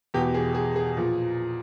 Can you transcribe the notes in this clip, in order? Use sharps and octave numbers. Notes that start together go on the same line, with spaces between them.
E2 B2 G4
G#4
G#4
G#4
A#2 F3